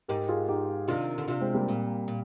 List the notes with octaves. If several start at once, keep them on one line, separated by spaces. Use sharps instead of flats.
G#2 G4 A#4
F4 G#4
D#4 G4
C3 D#3 D4 F4
D3
C3 D4 F4
G#3 C4
G3 A#3
A#2
A#2